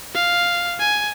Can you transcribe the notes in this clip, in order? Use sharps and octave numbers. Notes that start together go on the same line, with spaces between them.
F5
G#5